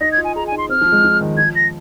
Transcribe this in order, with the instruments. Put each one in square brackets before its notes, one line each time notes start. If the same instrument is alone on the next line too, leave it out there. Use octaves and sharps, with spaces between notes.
[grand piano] D#4 [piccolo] A#6
[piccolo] G#6
[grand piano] F4
[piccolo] G#5
[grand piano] G#4 [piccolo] A#5
[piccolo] G#5
[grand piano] D#4
[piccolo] C6
[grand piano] C4 [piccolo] F6
[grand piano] F3
G#3
F3
D#3
[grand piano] F3 [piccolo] G#6
[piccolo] A#6